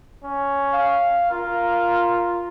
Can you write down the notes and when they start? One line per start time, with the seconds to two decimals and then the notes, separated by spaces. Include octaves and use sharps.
0.24 C#4
0.73 F5
1.32 F4 A#4